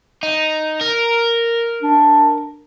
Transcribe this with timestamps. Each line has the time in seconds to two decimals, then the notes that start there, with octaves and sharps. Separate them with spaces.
0.23 D#4
0.81 A#4
1.83 D4